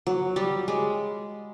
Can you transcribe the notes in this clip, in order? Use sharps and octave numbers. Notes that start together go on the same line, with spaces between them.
F#3
G3
G#3